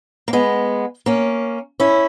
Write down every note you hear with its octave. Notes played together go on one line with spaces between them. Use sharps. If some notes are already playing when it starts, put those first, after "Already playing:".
A#3
G#3 B3
A#3 C#4
C#4 E4